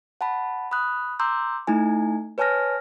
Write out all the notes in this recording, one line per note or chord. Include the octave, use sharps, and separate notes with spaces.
F#5 A5 B5
B5 D#6 F#6
A#5 C6 D6 E6 G6
A3 D#4 E4 G#5
B4 C#5 G#5 A5 F6 A#6